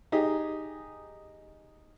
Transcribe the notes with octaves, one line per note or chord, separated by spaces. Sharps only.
D#4 G4 G#4